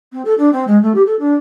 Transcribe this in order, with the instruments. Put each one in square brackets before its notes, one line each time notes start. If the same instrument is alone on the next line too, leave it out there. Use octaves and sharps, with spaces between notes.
[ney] C4
A4
D4
C4
G#3
A3
G4
A4
D4